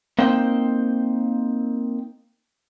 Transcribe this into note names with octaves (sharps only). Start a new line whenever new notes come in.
A#3 C4 D#4 C5 G5